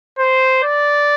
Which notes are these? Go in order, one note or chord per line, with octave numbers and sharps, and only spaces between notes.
C5
D5